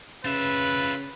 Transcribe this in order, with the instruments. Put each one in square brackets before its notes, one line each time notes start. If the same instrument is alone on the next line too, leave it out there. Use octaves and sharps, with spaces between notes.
[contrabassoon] C#3 [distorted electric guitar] F4 E5 [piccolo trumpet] B4